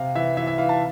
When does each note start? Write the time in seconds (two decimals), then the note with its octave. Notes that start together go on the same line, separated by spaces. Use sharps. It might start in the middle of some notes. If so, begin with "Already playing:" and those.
Already playing: C3 F5
0.15 E3 E5
0.37 E3 E5
0.47 E5
0.58 E3 F5
0.69 A5